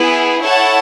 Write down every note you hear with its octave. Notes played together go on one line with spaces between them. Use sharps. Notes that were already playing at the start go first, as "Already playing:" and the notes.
Already playing: B3 E4 G#4
E4 A4 C#5 F#5 A5